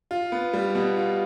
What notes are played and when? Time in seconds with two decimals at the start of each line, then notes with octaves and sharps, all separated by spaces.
0.11 F4
0.32 B3
0.53 G3
0.75 B2
0.97 F4